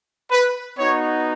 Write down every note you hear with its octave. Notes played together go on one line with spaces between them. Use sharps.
B4
B3 D#4 F#4 C#5